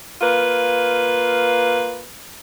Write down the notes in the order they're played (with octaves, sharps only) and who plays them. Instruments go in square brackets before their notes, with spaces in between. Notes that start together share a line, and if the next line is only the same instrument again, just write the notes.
[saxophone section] A#3 F4 B4